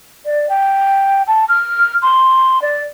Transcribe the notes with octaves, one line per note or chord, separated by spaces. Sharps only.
D5
G5
A5
F6
C6
D5